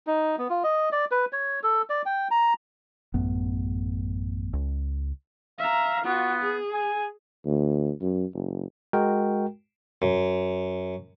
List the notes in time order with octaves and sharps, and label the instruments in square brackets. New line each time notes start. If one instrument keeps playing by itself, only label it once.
[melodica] D#4
B3
F4
D#5
D5
B4
C#5
A4
D5
G5
A#5
[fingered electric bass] A1 F#2 A2 B3
C#2
[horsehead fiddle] E5 A#5 [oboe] F5
[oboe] B3 [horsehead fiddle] F4 F#4
[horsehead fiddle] G#4
[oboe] G#5
[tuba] D2
F#2
F#1
[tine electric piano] G#3 F#4 A#4 G5
[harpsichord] F#2